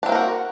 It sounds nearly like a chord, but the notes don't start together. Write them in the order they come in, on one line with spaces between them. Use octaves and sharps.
D4 C4 A#3 A#4 F#4